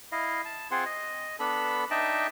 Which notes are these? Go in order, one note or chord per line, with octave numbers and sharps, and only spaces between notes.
E4 D#5 F5
A5
C4 F4 G#4 F#5 C6
D#5
B3 D4 A4 B5
D4 D#4 D#5 E5 G5 A5